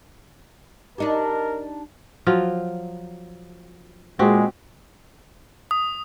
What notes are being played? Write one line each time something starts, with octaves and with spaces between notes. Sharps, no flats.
D4 D#4 G4 A#4
F3 F#3 F4
A#2 G#3 C4 F#4 G4
D#6